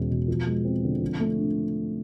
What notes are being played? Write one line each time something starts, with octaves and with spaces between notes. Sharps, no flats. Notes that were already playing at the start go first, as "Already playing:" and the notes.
Already playing: E2 B2 G#3 C#4
B2
F3
G#3
C4
D3
F3
A3
D4